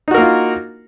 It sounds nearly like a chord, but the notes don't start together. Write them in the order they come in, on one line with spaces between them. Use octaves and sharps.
D#4 F#4 A#4 A#3 F4